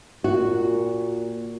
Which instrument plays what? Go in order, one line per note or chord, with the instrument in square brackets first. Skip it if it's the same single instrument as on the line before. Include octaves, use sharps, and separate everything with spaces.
[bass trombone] A#2 [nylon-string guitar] F#4